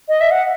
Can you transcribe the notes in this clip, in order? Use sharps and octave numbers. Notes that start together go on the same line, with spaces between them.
D#5
E5
F#5